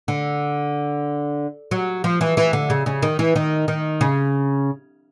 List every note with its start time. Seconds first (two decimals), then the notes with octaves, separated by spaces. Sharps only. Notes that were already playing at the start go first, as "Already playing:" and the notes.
0.08 D3
1.71 F#3
2.04 F3
2.21 E3
2.37 E3
2.53 D3
2.70 C#3
2.86 C#3
3.02 D#3
3.19 E3
3.36 D#3
3.68 D#3
4.01 C#3